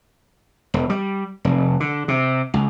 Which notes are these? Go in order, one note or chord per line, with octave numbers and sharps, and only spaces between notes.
E1
G3
F1
D3
C3
C#2